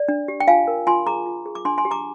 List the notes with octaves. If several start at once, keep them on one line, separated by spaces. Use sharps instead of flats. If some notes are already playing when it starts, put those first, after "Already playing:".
Already playing: D5
D4
G4
G5
F4 F5 G#5
A#4
F4 G#5 C6
G#4 A#5 D6
F4
G#4
D6
D4 G#5 C6
G#5 C6
G4
A#5 D6